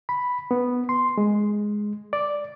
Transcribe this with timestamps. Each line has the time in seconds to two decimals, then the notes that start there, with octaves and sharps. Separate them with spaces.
0.09 B5
0.51 B3
0.89 C6
1.18 G#3
2.13 D5